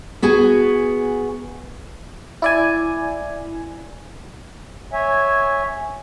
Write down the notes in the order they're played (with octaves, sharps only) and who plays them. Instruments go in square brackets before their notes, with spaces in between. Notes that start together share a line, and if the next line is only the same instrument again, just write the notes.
[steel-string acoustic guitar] B3 F#4 G#4 G#5
[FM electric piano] E4 D5 G#5
[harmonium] C#5 E5 G#5